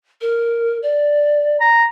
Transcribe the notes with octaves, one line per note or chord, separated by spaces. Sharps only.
A#4
D5
A#5